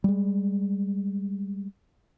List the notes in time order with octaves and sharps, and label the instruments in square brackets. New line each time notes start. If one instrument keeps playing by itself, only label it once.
[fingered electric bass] G3 G#3